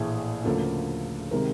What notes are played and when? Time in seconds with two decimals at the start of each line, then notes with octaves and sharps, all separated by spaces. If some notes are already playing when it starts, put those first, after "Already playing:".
Already playing: A#1 A2 E3 A3 G#4
0.44 D2 C#3 F3 A#3 A4
1.31 C3 D#3 G#3 A#4